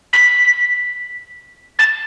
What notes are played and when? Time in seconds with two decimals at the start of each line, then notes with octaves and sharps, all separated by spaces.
0.13 B6
1.79 A6